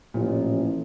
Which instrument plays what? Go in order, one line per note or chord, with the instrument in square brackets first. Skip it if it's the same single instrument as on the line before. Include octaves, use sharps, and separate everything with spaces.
[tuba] A1 [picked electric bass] A#2 F3